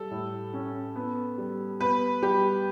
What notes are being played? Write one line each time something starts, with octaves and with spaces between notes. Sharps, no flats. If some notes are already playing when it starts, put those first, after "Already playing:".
Already playing: G3 A4
A2
C#4
B3
G3
B3 B4
G3 G4